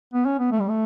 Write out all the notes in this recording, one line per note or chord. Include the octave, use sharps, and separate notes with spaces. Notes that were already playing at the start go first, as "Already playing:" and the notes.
B3
C#4
B3
A3
G3
A3